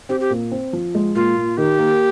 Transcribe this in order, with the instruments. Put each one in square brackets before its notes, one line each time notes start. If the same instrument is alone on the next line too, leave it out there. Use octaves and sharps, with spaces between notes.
[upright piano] C4 [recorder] G4
[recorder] G4
[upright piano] A#2
C4
F3
G#3
[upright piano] A#2 [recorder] F4
[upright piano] A#2
[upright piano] D#3 [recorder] G4
[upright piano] A#3